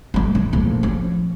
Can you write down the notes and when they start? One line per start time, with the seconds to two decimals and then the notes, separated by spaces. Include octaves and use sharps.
0.14 G3 A3
0.35 E3
0.53 A#1 A3
0.83 F3 C#4